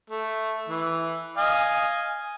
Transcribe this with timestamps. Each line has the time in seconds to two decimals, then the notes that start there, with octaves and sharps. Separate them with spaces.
0.10 A3
0.69 E3
1.37 D#5 F5 G#5